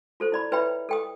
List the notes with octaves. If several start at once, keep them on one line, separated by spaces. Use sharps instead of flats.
F4 A4 C5
E4 D5 B5
E4 B4 C#5 E5 G5 B5
A4 G5 D#6